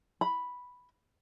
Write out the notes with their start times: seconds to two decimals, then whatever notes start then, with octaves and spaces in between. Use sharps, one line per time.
0.21 B5